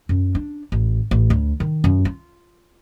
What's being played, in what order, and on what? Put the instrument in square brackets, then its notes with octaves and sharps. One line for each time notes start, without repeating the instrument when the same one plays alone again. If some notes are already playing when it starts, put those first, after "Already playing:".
[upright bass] F#2
D4
A1
A1
D2
D#3
F#2
F4